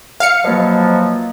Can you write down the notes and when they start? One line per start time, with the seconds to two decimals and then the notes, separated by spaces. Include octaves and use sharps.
0.20 F5 C#7
0.44 B2 F3 F#3 A#3 D#5